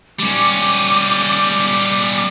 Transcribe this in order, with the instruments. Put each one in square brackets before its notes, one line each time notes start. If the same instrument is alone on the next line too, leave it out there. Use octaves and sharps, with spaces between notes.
[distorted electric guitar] G3 C#4 [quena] D6